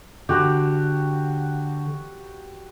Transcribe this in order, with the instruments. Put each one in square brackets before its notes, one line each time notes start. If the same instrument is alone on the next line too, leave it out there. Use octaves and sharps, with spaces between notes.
[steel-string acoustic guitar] D3 [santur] F#4 G4